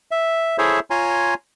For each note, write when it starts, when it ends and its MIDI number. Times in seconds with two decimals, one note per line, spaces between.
0.11 0.58 76
0.58 0.79 64
0.58 0.79 68
0.58 0.79 69
0.58 0.79 72
0.58 0.79 73
0.58 0.79 76
0.90 1.34 65
0.90 1.34 73
0.90 1.34 80
0.90 1.34 82
0.90 1.34 84